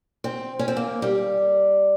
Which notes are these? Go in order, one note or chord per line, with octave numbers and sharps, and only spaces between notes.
C4
C#4
C4
A#3
G3